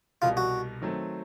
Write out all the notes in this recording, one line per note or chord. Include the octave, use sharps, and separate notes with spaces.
C2 B2 G3 F4
F#4
D#3 F#3 A3 C4